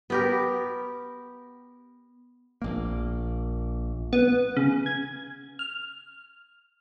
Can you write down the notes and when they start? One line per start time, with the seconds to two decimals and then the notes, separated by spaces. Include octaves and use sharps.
0.10 B3 G4 A#4
2.62 A#1 A#3
4.13 B3
4.57 C#3
4.86 G#6
5.59 F6